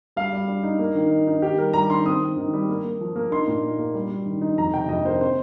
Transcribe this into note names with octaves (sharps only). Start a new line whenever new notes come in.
G3 F5
G3
G3
D#4
A#3
D#3
D#4
D#4
D#3 G4
G3 A#4
G3 A#5
D#3 C6
C4 D#6
C4
D#3
G3
A#3
A#3
F3
A#3
D#4 C6
A#2
D#4
A#3
G3
G3
D#3
D#4
F2 A#5
C3 G5
F2 D#5
A#3 C5
C4 C5